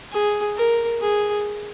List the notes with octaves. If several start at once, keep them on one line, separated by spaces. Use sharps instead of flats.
G#4
A#4
G#4